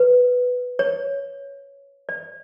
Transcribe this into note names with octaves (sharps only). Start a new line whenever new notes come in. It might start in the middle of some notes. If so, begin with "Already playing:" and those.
Already playing: B4
C#5
D5